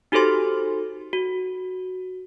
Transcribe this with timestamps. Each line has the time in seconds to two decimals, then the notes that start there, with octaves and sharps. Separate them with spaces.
0.12 D#4 F#4 G4 A4 C5 C6
1.13 F#4